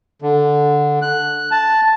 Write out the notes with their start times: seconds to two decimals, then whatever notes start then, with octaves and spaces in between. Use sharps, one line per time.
0.22 D3
1.02 F#6
1.51 A5